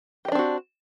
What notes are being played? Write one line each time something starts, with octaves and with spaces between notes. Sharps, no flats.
C4 D4 F#4 G4 D#5